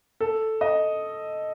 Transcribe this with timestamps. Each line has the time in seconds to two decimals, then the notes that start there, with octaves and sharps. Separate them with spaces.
0.20 A4
0.61 D#5